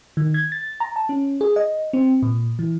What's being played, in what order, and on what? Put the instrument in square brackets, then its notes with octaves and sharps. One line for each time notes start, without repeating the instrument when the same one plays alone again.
[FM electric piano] D#3
G#6
A6
A#5
A5
C#4
G#4
D#5
C4
A#2
E3